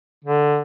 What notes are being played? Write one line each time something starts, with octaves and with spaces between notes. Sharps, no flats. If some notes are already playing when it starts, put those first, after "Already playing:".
D3